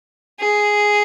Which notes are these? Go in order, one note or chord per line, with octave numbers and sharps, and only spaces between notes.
G#4